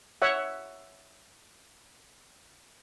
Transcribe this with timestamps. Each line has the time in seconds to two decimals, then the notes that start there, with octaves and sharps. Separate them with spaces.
0.22 C#5 E5 F#5